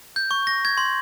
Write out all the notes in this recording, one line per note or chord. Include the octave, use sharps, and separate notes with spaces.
G6
C#6
A#6
G#6
C6